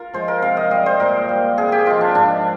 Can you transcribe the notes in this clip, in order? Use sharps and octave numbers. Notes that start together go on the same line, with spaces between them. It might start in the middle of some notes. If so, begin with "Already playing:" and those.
Already playing: F4 A#4
F3 G#3 C5
A#4
C3 F5
D#5
G3 D#5
C5
A#2 A#4
G3
C3 G#4
G4
F3 G#3 F4
D4
G#2 D4